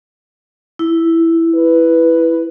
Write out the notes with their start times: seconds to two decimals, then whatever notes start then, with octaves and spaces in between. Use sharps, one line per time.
0.79 E4
1.55 B4